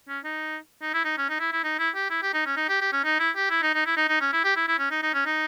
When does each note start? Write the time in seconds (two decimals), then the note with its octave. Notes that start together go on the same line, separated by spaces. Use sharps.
0.08 C#4
0.24 D#4
0.82 D#4
0.94 E4
1.05 D#4
1.18 C#4
1.29 D#4
1.40 E4
1.52 E4
1.64 D#4
1.79 E4
1.95 G4
2.10 E4
2.23 G4
2.34 D#4
2.46 C#4
2.57 D#4
2.69 G4
2.81 G4
2.92 C#4
3.04 D#4
3.20 E4
3.36 G4
3.50 E4
3.63 D#4
3.75 D#4
3.86 E4
3.97 D#4
4.09 D#4
4.21 C#4
4.33 E4
4.44 G4
4.56 E4
4.68 E4
4.78 C#4
4.91 D#4
5.03 D#4
5.14 C#4
5.26 D#4